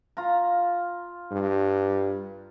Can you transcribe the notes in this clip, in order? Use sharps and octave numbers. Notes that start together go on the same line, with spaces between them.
F4 A#5
G2